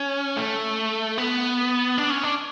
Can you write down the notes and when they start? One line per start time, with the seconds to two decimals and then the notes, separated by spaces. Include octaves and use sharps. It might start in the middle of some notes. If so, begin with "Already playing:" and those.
Already playing: C#4
0.37 A3
1.18 B3
1.98 D4
2.10 C#4
2.23 D4